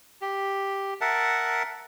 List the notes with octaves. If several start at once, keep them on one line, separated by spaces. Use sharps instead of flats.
G4
A#4 E5 F#5 A5